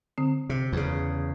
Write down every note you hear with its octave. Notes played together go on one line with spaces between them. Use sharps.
D3 C4
C3
E2 C#3